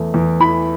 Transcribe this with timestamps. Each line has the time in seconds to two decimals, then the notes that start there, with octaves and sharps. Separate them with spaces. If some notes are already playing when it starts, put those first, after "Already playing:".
Already playing: E2 E3 A3
0.14 E2
0.40 E3 B5